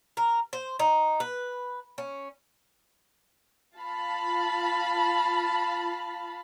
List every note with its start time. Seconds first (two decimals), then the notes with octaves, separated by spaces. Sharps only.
0.17 A#4
0.53 C5
0.79 D#4
1.20 B4
1.98 C#4
3.76 F4 F5 A5 B5